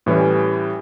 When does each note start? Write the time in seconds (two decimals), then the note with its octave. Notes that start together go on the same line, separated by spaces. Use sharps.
0.06 A2 E3 G3 C#4